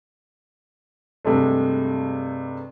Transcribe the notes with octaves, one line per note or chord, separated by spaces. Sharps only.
G2 C3 G#3 A3